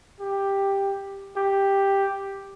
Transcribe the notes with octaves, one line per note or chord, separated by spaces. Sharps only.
G4
G4